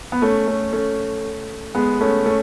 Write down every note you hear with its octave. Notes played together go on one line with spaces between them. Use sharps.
B3
A3 C#4
A3 C#4
A3 C#4
G#3 B3
A3 C#4
A3 C#4